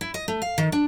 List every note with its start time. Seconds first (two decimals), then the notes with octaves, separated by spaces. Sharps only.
0.01 E4
0.14 D#5
0.28 A3
0.42 F5
0.58 D#3
0.72 D4